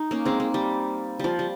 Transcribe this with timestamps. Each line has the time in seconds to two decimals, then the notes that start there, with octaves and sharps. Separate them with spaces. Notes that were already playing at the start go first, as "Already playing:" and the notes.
Already playing: D#4
0.11 A#3 C#4
0.26 G#3 C4
0.40 A#3
0.54 G3
1.19 F3 G3
1.39 G3